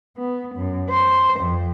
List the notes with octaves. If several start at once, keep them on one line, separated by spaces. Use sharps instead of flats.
B3
F#2
C5
F2